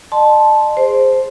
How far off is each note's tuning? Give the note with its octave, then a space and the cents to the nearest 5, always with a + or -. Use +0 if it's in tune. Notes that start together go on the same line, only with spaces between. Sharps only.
D#5 -45 A5 -10 C6 +0
G#4 -15 C5 +0